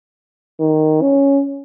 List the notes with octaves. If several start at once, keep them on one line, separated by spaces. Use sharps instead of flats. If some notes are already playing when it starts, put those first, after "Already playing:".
D#3
C#4